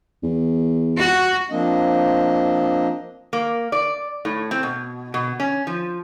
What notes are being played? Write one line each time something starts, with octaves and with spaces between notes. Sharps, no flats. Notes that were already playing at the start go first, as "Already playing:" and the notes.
E2
F#4
F3 A#3 C4 D4 D#5
A#3
D5
A2
C4
B2
B2
C#4
F3